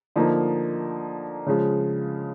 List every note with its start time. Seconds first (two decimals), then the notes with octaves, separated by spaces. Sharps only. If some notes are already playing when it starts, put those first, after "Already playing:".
0.16 D3 F3 A#3 D#4
1.46 C#3 F3 G#3